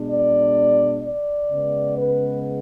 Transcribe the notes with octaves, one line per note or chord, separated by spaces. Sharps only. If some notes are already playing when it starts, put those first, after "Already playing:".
Already playing: B2 G#3 D4
D5
D5
C#3 G#3 B3
B4